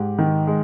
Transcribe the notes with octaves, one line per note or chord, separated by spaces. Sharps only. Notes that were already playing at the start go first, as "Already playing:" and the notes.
Already playing: G#2 G4
D#3
G#3